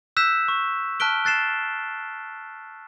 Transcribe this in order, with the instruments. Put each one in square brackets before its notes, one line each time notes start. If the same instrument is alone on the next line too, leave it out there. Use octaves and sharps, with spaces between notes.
[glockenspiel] E6 F#6 G6 B6 E7
C#6
A5 F6 F#6 B6 D7 G7
F#6 A6 C7 E7